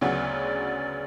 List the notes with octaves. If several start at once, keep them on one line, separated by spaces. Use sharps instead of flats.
D2 C#3 F#3 B3 D5